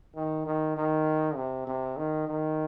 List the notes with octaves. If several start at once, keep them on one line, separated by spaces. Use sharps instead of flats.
D#3
D#3
D#3
C3
C3
D#3
D#3